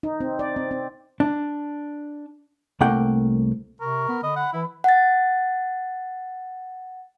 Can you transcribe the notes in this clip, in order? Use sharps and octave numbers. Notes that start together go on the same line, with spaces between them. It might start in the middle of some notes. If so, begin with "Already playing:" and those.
D#4
C4
D5
C4
C4
D4
C2 A3 A#3 F#5 G5
C3 A#4 C#6
B3
D3 D#5 B5
F#5
E3 E4
F#5 A6